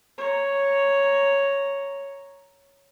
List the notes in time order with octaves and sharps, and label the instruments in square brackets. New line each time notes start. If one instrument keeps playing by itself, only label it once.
[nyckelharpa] C#5 A#5